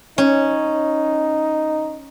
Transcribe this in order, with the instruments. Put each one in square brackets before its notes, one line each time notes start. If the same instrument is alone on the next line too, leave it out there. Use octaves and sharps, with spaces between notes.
[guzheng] C#4 [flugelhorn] D#4